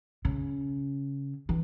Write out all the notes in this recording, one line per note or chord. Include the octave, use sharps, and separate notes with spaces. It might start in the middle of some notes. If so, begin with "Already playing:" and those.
C#3
E3